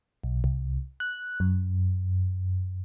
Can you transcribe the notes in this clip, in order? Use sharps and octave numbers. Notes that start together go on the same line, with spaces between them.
B1
C2
F#6
F#2